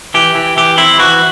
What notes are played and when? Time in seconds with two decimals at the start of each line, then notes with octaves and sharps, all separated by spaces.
0.14 E3 G4
0.35 E3
0.57 E3 G4
0.78 C4 E4
0.99 E3 F#4